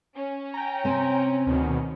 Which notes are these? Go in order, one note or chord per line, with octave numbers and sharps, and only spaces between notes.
C#4
G5 A#5
C3 C4 G#5
D2 B2 D#3